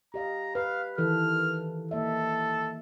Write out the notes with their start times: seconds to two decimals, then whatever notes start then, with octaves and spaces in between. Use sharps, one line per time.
0.14 G4 D#5 F5 A#5
0.55 B4 F5
0.98 D#3 E3 A4 F6
1.91 A#3 A4 D#5 E5